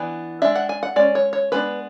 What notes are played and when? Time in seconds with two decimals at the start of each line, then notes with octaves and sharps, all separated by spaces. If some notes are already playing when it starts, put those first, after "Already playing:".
Already playing: E3 B3 D4
0.42 G#3 D4 E5
0.56 F#5
0.69 G#5
0.83 F#5
0.96 G#3 C#4 D5
1.15 C#5
1.33 C#5
1.52 G#3 B3 D4 B4